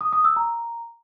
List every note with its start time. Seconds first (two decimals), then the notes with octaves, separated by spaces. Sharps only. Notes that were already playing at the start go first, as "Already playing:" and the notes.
0.01 D#6
0.13 D#6
0.24 E6
0.36 A#5